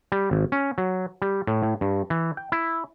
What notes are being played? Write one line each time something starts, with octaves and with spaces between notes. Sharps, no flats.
G3
G#1
C#4
F#3
G3
A2
A2
G2
E3
G5
E4